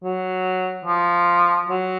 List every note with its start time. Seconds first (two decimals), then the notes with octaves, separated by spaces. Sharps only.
0.03 F#3
0.85 F3
1.68 F#3